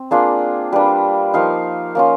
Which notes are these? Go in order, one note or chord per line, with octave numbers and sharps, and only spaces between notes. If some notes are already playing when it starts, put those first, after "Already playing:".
Already playing: C4
A#3 D4 F4 G#4
G3 A#3 D4 B4
F3 A#3 D#4 F5
A#3 C#4 F4